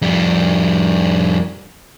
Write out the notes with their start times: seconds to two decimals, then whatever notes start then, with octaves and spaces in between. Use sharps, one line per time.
0.02 F2 G3